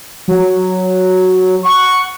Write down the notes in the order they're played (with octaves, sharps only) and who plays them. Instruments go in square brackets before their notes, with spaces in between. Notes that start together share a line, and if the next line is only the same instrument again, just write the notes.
[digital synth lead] F#3
[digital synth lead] F#5 [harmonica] C#6